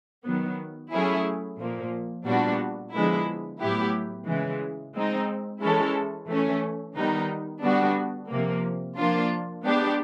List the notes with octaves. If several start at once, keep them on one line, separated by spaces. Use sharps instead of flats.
D#3 F#3 B3
F#3 A3 C#4 E4 G#4
A#2 F3 A#3
A#2 G3 B3 D4 F#4
D3 F3 G#3 B3 E4
A2 F#3 B3 E4 G4
C#3 E3 G#3
G#3 C4 D#4
E3 G#3 C#4 E4 A4
E3 A3 C#4
D#3 G3 B3 D#4
D3 G3 B3 D4 F#4
C3 F3 A#3
F3 A#3 D4 F4
G#3 B3 D4 G4